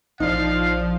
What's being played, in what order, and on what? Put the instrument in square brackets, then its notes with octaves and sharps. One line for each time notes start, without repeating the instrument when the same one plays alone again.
[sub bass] A#1 [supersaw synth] F3 [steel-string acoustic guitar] D#4 D5 [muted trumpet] F5